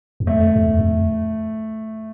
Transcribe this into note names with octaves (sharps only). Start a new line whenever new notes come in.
E2
F2 A3
E2
E2
F2